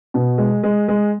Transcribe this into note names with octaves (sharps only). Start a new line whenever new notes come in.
B2
G#3
G#3
G#3